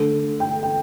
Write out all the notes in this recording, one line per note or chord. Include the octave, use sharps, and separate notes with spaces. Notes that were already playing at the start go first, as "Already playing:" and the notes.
Already playing: D3 A3 A4
G5
G5